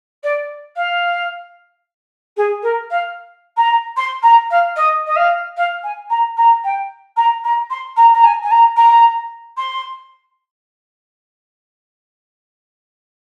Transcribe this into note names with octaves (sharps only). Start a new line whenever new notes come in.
D5
F5
G#4
A#4
F5
A#5
C6
A#5
F5
D#5
D#5
F5
F5
G#5
A#5
A#5
G5
A#5
A#5
C6
A#5
A#5
G#5
G#5
A#5
A#5
C6